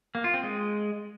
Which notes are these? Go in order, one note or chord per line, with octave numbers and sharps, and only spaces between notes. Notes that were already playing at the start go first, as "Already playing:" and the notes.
A#3
F4
C4
G#3